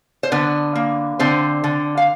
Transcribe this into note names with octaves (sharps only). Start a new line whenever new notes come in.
C5
D3 B3 B4
A#3
D3 C4 C5
D3
F5